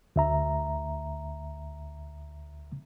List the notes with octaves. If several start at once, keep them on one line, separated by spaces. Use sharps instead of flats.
D2 E5 A#5